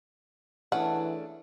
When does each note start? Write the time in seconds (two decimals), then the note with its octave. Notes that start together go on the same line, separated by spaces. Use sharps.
0.72 E3 A3 C#4 D4 G#4 F#5